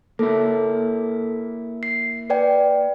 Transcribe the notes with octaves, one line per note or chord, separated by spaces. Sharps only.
A#3 E4 A4
C7
B4 D5 G5